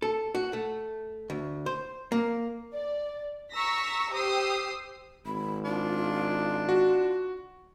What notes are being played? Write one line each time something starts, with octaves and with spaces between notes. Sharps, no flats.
A4
F#4
A3
D2
C5
A#3
D5
A#5 C#6 E6 A#6 B6
G4 C5 D#6 E6 C7
G#1 B5
D4 F4
F#4